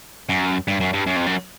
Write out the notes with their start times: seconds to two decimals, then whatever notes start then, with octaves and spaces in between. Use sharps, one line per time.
0.29 F#2
0.68 G2
0.80 F#2
0.93 G2
1.06 F#2
1.16 F2
1.26 F#2